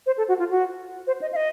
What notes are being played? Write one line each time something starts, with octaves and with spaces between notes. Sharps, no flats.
C5
A4
F#4
F4
F#4
C5
D#5
F5
D#5